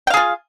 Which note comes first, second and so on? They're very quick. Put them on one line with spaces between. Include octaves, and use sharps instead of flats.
G5 F5 G#4 F4